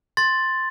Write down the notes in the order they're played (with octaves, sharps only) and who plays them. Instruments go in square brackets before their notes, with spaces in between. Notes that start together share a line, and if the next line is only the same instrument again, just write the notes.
[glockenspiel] C6 A6